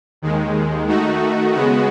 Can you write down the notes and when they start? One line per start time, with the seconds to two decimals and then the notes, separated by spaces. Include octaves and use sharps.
0.22 D#2 D#3 G#3
0.88 D#3 A3 D#4 F#4
1.55 C#3 G#3 B3 F#4